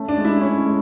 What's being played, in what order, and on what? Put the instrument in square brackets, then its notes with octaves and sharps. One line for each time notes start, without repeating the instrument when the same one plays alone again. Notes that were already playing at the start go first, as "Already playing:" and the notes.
Already playing: [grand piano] A3 C#4
[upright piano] D4
[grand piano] G#3
[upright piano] E4
[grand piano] C#4
G#3